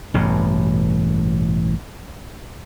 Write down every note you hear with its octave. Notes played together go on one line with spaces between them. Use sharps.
A1 G2 B2